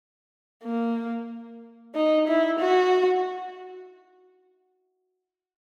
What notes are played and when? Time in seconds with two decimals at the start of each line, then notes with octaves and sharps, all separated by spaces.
0.64 A#3
1.95 D#4
2.28 E4
2.60 F#4